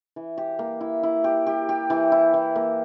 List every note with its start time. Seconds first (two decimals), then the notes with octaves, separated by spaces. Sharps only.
0.16 E3
0.38 G4
0.59 A#3
0.81 E4
1.03 E4
1.24 G4
1.47 G4
1.69 G4
1.90 E3
2.12 E4
2.34 E3
2.56 A#3